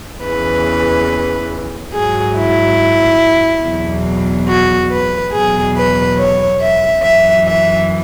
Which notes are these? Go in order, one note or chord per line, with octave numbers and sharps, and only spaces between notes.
E2 C#3 E3 B4
G#2 F#3 G#4
E4
E2 B2 F#3
F#4
B4
E2 B2 F#3 G#4
B4
C#5
E5
F#2 E3 E5
E5